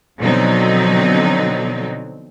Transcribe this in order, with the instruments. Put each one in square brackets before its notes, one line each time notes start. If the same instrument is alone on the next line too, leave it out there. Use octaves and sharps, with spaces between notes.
[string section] B2 D3 F3 F#3 C4 D#4